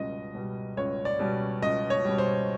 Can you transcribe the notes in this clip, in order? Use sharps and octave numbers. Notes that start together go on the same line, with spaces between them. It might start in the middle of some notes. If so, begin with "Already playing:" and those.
Already playing: C#2 B2 G3 D#5
B2 G3
C#2 C#5
D5
B2 G3
C#2 D#5
C#5
B2 G3
C5